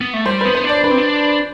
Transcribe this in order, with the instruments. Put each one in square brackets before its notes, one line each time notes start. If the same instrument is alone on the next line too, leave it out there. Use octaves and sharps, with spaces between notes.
[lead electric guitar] B3
A3
[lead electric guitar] G3 [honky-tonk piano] C5
[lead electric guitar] B3 [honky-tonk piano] B4
[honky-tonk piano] C5
[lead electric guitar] D4
[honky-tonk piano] D5
[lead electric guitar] D4 [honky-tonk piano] B4
[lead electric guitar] C4
D4